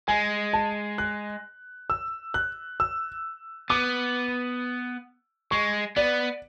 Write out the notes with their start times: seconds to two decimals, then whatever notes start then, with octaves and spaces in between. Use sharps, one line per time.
0.08 G#3 G#5
0.53 A5
0.98 F#6
1.90 E6
2.34 F#6
2.80 E6
3.70 B3 D6
5.51 G#3 C#6
5.96 B3 D5